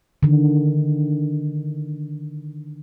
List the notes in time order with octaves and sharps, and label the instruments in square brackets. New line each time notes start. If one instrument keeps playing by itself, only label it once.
[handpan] D3 D#3